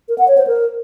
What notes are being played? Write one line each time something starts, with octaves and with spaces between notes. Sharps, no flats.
A#4
F#5
C#5
C5
A#4